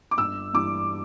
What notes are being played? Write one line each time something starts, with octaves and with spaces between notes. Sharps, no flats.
D6
G1 E6
G2 E3 D6